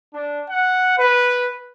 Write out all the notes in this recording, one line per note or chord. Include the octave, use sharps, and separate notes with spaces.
D4
F#5
B4